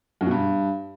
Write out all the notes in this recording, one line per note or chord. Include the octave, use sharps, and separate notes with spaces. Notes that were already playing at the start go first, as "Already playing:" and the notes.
F#2
B2
G2